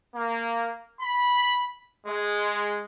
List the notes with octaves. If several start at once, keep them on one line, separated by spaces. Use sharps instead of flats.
A#3
B5
G#3